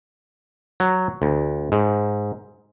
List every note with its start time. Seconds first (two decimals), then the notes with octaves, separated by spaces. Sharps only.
0.80 F#3
1.22 D2
1.72 G#2